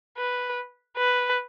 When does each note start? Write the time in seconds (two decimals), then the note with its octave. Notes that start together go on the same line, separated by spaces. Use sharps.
0.18 B4
0.97 B4